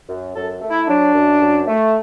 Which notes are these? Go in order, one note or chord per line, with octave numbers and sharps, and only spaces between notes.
F#2
F#2 A4
A3
E4
F#3 D4
F#2
F#2
A3